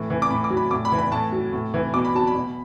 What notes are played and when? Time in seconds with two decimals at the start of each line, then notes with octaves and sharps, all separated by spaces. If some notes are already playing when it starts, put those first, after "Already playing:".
Already playing: A2 E3
0.10 E3
0.22 D6
0.30 A2 B5
0.44 D6
0.50 F#3
0.57 B5
0.71 A2 D6
0.85 B5
0.92 E3
0.99 B5
1.12 A2 A5
1.32 F#3
1.53 A2
1.74 E3
1.94 B2 D6
2.05 B5
2.15 F#3 A5
2.27 B5
2.35 B2